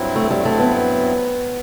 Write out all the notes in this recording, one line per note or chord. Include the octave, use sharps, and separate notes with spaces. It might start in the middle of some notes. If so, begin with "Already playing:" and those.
Already playing: G2 F#3 C4 E4
A3
G3
A3
B3